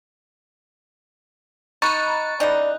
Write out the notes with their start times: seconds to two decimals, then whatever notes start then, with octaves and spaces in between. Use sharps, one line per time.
1.82 D#4 A#5 B5 C#6 F#6 A6
2.40 C#3 E3 D#4 D5